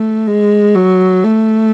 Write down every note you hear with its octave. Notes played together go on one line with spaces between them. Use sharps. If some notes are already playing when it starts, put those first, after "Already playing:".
Already playing: A3
G#3
F#3
A3